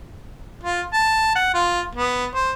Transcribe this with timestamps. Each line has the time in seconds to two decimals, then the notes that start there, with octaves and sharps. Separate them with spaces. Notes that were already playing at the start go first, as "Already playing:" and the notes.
0.63 F4
0.93 A5
1.35 F#5
1.54 F4
1.95 B3
2.35 C5